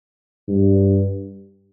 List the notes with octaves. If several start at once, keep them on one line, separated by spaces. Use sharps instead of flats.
G2